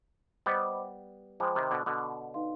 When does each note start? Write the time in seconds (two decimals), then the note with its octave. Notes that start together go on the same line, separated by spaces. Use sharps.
0.46 G3 B3 C5 D#5 B5 D6
1.40 F3 G#3 C5 G5 B5 D6
1.56 C3 D#3
1.71 B2 D3
1.86 B2 D3
2.34 D#4 B4 F5 C6